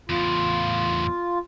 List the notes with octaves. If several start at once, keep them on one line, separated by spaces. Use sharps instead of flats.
E2 A2 F4